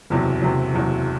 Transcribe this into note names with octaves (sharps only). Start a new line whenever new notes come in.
F#1 E2 C3 F#3
F#1 E2 C3 F#3
F#1 E2 C3 F#3